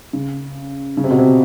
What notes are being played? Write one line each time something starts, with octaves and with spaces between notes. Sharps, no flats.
C#3
C#3
C3
B2
C3